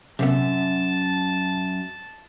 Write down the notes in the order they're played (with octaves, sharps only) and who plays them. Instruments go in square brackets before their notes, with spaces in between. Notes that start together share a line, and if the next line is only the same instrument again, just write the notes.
[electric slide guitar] F#2 E5 [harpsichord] C3 A#3 B3 [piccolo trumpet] A5